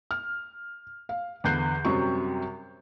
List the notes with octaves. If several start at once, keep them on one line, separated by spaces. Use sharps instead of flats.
F6
F5
E2 D3 B3 F#6 G6 C7
F#2 C3 F#3 G3 C#6